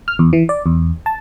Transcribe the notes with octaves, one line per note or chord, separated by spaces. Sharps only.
F6
E2
E3
D5
E2
A5